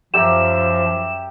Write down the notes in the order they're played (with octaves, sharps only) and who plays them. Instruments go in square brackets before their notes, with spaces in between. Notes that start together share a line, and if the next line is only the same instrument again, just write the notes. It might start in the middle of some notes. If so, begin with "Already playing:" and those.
[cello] F#2 [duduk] F3 [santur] G4 E5 A#5 [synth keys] E7